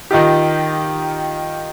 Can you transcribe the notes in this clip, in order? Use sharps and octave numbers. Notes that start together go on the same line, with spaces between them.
D#3 D#4 F4 G4